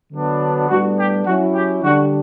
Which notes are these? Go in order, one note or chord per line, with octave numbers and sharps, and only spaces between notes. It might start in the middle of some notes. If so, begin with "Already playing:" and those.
D3 F#3 B3 D4
A2 G3 B3 D4 F#4
G4
F#3 C#4 E4 F#4
G4
D3 G3 D4 F#4